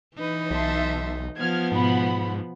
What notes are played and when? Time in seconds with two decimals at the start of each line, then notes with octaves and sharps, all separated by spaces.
0.17 E3 D#4 B4
0.51 B1 E5 A5 C6
1.37 F3 B3 F6 G#6
1.72 G#2 B2 F#5 B5